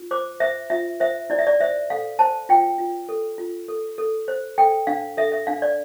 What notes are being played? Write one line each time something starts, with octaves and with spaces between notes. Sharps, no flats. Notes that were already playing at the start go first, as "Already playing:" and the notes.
Already playing: F4
C5 D6
C5 E5
F4 E5
C5 E5
E4 D5
E5
D5
C5 E5
A4 F5
C5 A5
F4 G5
F4
A4
F4
A4
A4
C5
A4 G5
D4 F5
A4 E5
E5
D4 F5
D5